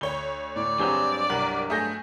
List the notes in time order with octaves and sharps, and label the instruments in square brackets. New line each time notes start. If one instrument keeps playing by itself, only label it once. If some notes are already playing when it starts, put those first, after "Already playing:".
[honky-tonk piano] D2 C#5 [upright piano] G7
[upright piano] A2 [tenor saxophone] D5
[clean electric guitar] G2 F#3 G#3 [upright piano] C4 G4 G#4
[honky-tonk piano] C2 A#4 F#7 [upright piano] F#5 A#5
[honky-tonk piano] A3 G#4 [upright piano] D#6 G6 A#6